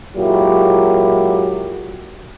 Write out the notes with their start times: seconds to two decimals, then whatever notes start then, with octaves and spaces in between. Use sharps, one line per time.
0.15 A#2 F#3 G#3 E4 G4